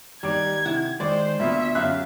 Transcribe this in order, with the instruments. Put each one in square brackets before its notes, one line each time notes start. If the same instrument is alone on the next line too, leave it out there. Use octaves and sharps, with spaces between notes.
[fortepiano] D#2 [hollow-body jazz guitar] G3 D5 [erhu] G#6
[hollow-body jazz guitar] C3 E4 F#5
[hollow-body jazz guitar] D#3 G#3 [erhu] C5 [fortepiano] D5
[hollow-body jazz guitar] D2 B3 [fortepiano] A#2 [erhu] E5
[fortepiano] F#2 E5 F#6 [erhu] F5